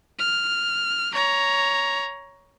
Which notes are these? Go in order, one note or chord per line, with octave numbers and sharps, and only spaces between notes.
F6
C#5 A#5